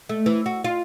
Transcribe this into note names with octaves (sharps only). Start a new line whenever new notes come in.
A3
E3
F#4
F4